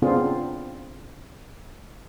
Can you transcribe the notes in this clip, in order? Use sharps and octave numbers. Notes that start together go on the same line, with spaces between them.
C#3 B3 C4 D4 F4 G#4